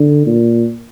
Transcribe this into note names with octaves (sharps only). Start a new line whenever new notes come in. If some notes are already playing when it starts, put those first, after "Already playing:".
Already playing: D3
A#2